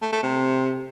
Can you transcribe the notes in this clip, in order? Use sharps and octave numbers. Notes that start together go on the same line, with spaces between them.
A3
A3
C3